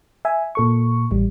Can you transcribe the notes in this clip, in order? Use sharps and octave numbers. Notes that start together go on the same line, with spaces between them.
E5 G#5
A#2 A4 C#6
A1 G3